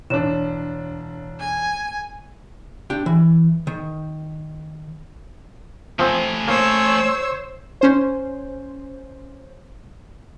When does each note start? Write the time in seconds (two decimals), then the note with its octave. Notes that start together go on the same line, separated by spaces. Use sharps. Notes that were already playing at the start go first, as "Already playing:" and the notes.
0.10 E1 D4 C#5 E7
1.40 G#5
2.90 D4 G4 G5
3.06 E3
3.67 D#3
5.99 F3 A3 C4 G#5
6.48 A#3 C5 C#5 E6
7.81 C#4 C5